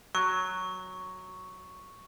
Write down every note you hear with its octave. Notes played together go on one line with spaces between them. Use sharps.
F#3 C#6